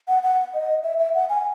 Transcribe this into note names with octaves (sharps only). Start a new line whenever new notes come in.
F#5
F#5
D#5
E5
E5
F#5
G#5